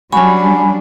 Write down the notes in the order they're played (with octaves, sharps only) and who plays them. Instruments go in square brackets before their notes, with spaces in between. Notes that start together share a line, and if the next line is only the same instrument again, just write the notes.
[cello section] F#3 G3 D4 [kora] C#4 F#4 [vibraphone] G#5 B5